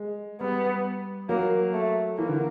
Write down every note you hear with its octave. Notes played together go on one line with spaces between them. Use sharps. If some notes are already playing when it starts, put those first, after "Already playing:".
Already playing: G#3
G3 B3
F#3 A#3
A3
E3 A#3
D3